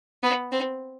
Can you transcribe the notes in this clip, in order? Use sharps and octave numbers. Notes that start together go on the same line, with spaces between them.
B3
C4